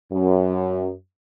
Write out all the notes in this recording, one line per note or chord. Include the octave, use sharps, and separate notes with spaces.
F#2